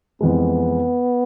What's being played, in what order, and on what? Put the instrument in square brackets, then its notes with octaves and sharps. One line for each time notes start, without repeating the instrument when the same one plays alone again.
[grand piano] F2 E3 G#3 [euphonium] B3